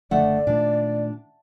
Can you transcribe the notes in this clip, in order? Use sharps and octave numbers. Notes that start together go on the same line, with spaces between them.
F#1 D3 A3 D5 F#5
A#2 D#3 A3 D4